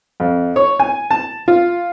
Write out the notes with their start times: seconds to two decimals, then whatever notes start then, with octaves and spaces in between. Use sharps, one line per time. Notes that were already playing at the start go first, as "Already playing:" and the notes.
0.20 F2
0.56 C#5
0.80 G#5
1.11 A5
1.48 F4